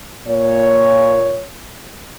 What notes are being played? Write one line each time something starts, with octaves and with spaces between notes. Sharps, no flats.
A#2 C#5